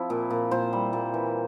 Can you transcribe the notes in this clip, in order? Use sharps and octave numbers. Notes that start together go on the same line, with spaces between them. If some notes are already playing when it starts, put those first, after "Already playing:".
Already playing: F3 C4 E4
A#2
A#2
A#2 C5
G3
A#2
E3